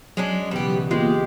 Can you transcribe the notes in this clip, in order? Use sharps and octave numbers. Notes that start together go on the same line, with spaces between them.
F#3 G#3 C#4 D4
B1 C#3 E3 G3 B3 G4
G#3 A#3 B3 F4 G4